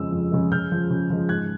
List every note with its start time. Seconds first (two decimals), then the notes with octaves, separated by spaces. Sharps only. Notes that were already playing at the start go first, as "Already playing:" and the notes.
Already playing: F2 C#3 F3 G#3 E6
0.12 F2
0.32 C#3 F3 G#3
0.52 C#3 F6 G6
0.71 F3 G#3
0.90 C#3
1.10 F3 G#3
1.29 G#2 F#6 G#6